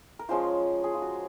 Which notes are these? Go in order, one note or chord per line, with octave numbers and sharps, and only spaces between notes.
A#4
F3 G#3 C#4 F4 C5
G#4
F4
F#4